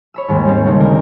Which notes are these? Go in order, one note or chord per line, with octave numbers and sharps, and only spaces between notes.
C#5 B5 E6
D#2 G#2 G#3 A#3
G3 C4 C#4
C#3 G#3 A3 C4 D#4
D2 D4 A#4